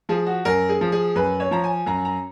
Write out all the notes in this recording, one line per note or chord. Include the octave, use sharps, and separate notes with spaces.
F3 G#4
F#4
F#2 A#4
G#4
F3
G#4
F#2 B4
C#5
F3 A#5
G#5
F#2 A#5
A#5